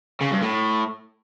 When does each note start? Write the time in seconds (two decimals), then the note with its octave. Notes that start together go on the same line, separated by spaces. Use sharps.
0.21 C#3
0.32 G2
0.42 A2